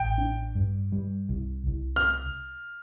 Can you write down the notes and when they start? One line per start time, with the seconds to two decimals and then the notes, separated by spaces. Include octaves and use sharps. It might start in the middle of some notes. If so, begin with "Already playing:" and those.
Already playing: A1 G5
0.18 D4
0.55 G2
0.92 G3
1.29 C2
1.67 C2
1.96 F6